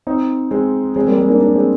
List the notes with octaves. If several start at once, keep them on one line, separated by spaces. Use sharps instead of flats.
C4 D#4
G#3 C4
G#3 C4
G3 A#3
G#3 C4
A#3 D4
A#3 D4
G#3 C4